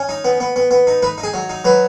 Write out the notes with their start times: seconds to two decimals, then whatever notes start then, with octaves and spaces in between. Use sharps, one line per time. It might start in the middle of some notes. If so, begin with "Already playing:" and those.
Already playing: C#4
0.09 D#4
0.25 B3
0.40 B3
0.56 B3
0.71 B3
0.87 D#4
1.03 D#4 B4
1.18 D#4
1.23 G#4
1.34 F#3
1.50 D#4
1.65 F#3 B4